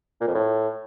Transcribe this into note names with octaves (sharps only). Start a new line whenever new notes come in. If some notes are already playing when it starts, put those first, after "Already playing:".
A#2
F2
A2